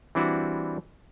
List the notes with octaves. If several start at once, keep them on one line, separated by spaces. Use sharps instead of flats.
E3 G3 C4 D4 E4 F#4